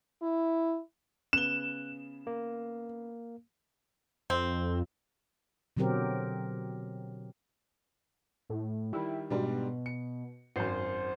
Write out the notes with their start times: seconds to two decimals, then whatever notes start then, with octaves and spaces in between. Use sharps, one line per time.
0.22 E4
1.33 C#3 B3 F#6 E7 G7
2.27 A#3
4.30 F2 C4
5.77 B2 D3 F#3 C4 G4 A#4
8.50 A2
8.93 D#3 G3 E4
9.30 G#2 B2 G3 D4
9.86 C#7
10.56 G#1 F#2 C5